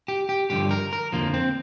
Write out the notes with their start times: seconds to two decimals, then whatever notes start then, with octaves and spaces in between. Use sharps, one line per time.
0.08 G4
0.29 G4
0.50 G2 D3 F3 G4
0.71 A#4
0.93 A#4
1.12 F2 D3 F3 A#3
1.34 C4